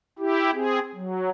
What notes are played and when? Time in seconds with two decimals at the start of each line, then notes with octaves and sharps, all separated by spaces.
0.19 E4 G4
0.54 C4 G#4
0.95 F#3